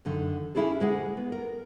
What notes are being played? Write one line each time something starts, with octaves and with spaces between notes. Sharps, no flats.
F#2 D3 D#3
C#4 D4 E4 F4 G#4 A4
D2 G#3 G#4 F5 F#5
B3
A#4